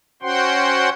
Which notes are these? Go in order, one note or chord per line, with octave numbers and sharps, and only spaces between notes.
C#4 F#4 C5 F#5 G5 C6